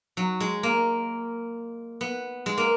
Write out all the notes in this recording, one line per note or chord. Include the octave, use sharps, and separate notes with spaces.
F#3
G#3
A#3
B3
G#3
A#3